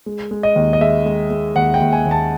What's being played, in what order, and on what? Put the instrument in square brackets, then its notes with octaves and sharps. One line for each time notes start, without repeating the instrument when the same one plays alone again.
[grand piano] G#3
G#3
D#5
D#2
D#5
G#3 E5
G#3
G#3
D#2 F#5
G5
D#2
G#5
D#2
A5